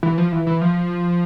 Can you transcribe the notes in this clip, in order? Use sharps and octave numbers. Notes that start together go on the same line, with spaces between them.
E3
F3
E3
E3
F3